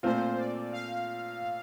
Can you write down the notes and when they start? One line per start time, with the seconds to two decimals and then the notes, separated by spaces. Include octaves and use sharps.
0.03 A#2 A3 C4 F4 C5
0.38 D5
0.72 F5